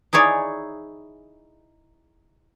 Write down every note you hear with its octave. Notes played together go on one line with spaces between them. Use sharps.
D#4 E4 G#4 C#5 D5